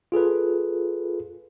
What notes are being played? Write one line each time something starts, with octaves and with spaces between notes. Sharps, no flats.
F4 G#4 A4 B4